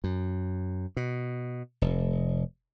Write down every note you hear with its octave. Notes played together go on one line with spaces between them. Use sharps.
F#2
B2
F1